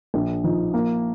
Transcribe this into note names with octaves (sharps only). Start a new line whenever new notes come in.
A#1
F3 D#4
A#3